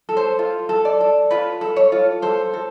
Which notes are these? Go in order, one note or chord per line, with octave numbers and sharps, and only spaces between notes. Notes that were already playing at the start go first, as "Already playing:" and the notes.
A4
C5
F4
A4
D5
A4
F4 B4
A4
C#5
F4
A4 C5
A4